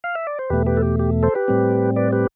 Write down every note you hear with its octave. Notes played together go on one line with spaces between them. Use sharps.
F5
E5
D5
C5
E2 B2 A3 G4 B4
G4 B4
A4
G4
G4
A4 C5
G4 B4
A2 G3 C4
B4 D5
G4 B4